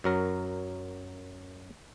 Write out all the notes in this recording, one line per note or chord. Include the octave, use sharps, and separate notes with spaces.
F#2 F#3 A#4